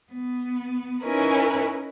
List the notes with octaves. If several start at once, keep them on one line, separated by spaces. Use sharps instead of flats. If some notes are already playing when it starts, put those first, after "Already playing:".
B3
C#4 D#4 E4 A#4 B4